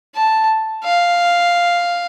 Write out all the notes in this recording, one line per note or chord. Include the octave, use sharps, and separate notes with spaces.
A5
F5